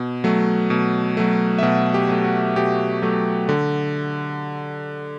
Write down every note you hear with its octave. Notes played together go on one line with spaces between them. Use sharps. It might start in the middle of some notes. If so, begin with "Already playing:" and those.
Already playing: B2
F#3 A3
B2
F#3 A3
E5
B2 F#5
G4
F#3 A3
F#4
B2 G4
F#3 A3
D3